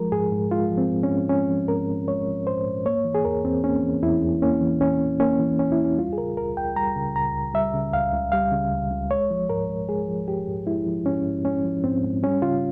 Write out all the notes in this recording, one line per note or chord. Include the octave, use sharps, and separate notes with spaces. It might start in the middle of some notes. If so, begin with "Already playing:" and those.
Already playing: F3 G#3 A#4
G#2 G#4
G#2
G#3 F4
F3
C4
G#2
C#4
G#2
G#3 C#4
F3
G#2 A#4
G#2
G#3 C#5
F3
G#2 C5
G#2
A#3 C#5
E3
G#4
E2 A#4
E2 C4
A#3 C#4
E3
E2 E4
E2
A#3 C#4
E3
E2 C#4
E2
A#3 C#4
E3
E2 C#4
E4
E2
C#4
G3 F4
G#4
C#3 A#4
C#2 A#4
C#2 G5
G3 A#5
C#3
C#2 A#5
C#2
G3 E5
C#3
C#2 F5
C#2
G3 F5
C#3
C#2
C#2
G#3 C#5
F3
G#2 A#4
G#2
G#3 G#4
F3
G#2 G4
G#2
G#3 E4
F3
G#2 C#4
G#2
G#3 C#4
F3
G#2 C4
G#2
G3 C#4
C#3 F4